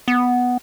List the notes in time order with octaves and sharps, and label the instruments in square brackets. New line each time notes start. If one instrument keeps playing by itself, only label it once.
[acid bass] B3